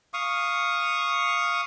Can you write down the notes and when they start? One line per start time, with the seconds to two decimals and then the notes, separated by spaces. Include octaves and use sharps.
0.14 F5 C#6 D#6